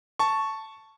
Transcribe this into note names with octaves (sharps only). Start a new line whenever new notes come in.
A5 C#6